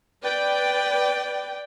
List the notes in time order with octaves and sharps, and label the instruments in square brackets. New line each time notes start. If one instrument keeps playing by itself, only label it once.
[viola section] B4 D5 G5